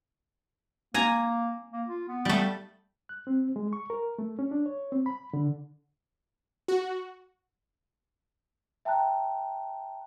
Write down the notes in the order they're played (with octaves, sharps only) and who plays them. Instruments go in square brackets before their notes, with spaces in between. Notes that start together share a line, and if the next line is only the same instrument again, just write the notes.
[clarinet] A#3 [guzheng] G#5 A#5
[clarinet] A#3
F4
B3
[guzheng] G3 A3
[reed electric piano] F#6
C4
G#3
C#6
A#4
A3
C#4
D4
C#5
C4
B5
D3
[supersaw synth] F#4
[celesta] E5 G5 A5 A#5 F#6